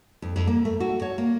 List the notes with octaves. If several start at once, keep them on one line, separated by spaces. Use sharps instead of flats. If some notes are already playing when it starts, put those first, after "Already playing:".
F2
F2
A#3
A3
F#4
C#5
A#3